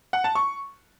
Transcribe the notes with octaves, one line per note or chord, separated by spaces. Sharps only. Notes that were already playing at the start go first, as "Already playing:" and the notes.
F#5
A5
C#6